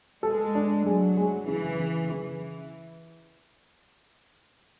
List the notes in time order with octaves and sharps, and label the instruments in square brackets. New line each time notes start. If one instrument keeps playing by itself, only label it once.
[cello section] G#3 [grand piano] A4
[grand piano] D4
[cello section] F#3 [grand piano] G#3
[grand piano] G#3
[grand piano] C#3 [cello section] E3
[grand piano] C#3
[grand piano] C#3 [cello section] E3